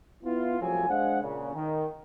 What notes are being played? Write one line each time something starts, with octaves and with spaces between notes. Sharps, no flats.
B3 E4 F4
C2 A2 F3 F#3 C4 G#5
G#3 D4 C5 F5 F#5
A#2 C#3
D#3